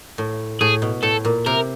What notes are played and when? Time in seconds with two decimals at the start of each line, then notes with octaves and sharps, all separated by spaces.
0.18 A2
0.61 A2 G#4
0.82 B2
1.03 A2 A4
1.25 A#2
1.46 C3 A#4